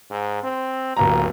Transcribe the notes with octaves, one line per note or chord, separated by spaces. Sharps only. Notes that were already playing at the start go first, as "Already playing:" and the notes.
G#2
C4
D1 G1 A#3 A#5